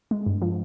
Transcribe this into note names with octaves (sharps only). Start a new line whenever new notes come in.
G#3
G2
F3